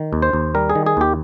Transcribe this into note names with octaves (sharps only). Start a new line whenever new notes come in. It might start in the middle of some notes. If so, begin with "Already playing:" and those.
Already playing: D#3
D#2
C5
D#2
G3 A#4
G#4
D#3
G#4
D#2 G4